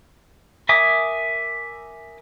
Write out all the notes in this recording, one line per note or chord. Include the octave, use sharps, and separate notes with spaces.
A#4 E5 G#5 D6 D#6